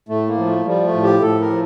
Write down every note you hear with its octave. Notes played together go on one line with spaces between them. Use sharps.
A2 A3
A#3
F3
A3
F3 G3
A3
A2
G4
A2 A4
A#4
F3